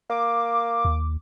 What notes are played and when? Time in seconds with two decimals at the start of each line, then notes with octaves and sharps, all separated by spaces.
0.10 A#3 D6
0.85 D#2